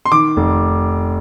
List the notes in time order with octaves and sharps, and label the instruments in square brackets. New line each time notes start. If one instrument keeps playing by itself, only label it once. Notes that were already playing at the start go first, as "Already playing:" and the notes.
[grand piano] C6
D#3 D6
F1